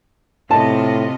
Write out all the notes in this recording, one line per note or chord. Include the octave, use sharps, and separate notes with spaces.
A2 C3 F4 D#5 A5